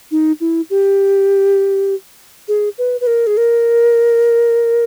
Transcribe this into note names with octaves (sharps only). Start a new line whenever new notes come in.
D#4
E4
G4
G#4
B4
B4
A#4
G#4
A#4